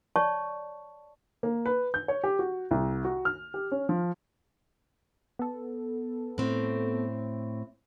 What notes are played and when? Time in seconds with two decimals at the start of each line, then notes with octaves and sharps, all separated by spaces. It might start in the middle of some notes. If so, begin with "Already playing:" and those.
0.16 C#5 D5 A5 C#6
1.43 A#3
1.66 B4
1.94 G6
2.08 C#5
2.24 G4
2.39 F#4
2.71 C2
3.05 F#4
3.25 F6
3.54 G4
3.72 C#4
3.89 F3
5.39 B3 A4
6.38 A2 C4